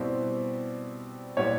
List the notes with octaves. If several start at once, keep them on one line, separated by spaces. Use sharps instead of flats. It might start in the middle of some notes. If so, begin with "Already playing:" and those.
Already playing: B2 G3 C4 E4
A#2 G3 B3 E4 C#5